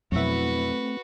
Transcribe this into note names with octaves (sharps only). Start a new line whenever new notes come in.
F2 B2 F#3 A3 C4 E4 F#4 B4